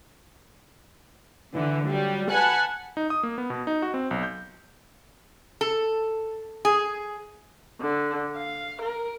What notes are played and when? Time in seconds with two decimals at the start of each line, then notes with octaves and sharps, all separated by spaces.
1.55 D3 E3
1.87 F#3 G3
2.30 B4 F#5 G#5 A5
2.97 D#4
3.10 D#6
3.23 A#3
3.38 B3
3.50 B2
3.67 D#4
3.82 F#4
3.94 C4
4.11 B1
4.23 G6
5.61 A4
6.65 G#4
7.81 D3
8.36 F5
8.82 A#4